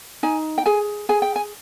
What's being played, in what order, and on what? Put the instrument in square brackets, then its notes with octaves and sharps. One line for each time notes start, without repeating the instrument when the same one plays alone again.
[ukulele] D#4 G#5
G5
G#4 G#5
G#4 G#5
G5
G#5